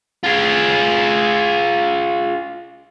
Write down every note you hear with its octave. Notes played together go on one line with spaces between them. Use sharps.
F4 G#4